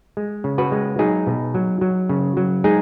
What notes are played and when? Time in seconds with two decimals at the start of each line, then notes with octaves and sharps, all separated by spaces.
0.17 G#3
0.44 C#3
0.58 F#4 B4
0.72 G#3
0.99 F#3 D#4 G#4
1.27 B2
1.55 F#3
1.81 F#3
2.09 C#3
2.37 F#3
2.64 G#3 D#4 G#4